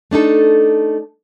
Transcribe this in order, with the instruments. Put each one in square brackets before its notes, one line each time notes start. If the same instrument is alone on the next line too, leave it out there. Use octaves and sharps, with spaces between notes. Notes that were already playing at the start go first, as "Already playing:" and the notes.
[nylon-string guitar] A3 D4 D#4 A4